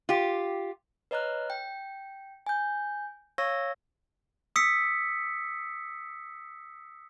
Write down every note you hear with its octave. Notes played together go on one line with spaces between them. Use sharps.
F4 G4
B4 C#5 D#5 A#5 F6 F#6
G5
G#5 G6
C#5 F5 C#6 E6 G#6 A#6
D#6 E6 B6 C#7